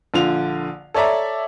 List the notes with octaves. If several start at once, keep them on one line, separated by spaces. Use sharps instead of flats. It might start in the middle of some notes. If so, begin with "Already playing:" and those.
A#1 D3 F4 F7
A4 C#5 D5 E5 A#5